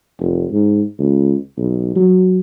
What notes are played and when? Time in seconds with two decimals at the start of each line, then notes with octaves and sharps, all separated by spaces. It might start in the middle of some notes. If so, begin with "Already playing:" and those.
0.19 F1
0.52 G#2
0.99 C#2
1.58 B1
1.96 F#3